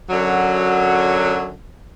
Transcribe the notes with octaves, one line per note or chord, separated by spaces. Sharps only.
F#2 D3 F#3